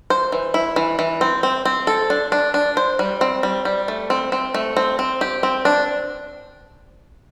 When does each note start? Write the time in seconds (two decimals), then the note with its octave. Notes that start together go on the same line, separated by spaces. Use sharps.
0.10 C5
0.32 E3
0.54 E4
0.76 E3
0.99 E3
1.21 C4
1.43 C4
1.65 C4
1.87 A4
2.10 D4
2.32 D4
2.54 D4
2.77 C5
2.99 G3
3.21 C4
3.43 G3
3.65 G3
3.88 A3
4.10 C4
4.32 C4
4.54 A3
4.77 C4
4.99 C4
5.21 G4
5.43 C4
5.65 D4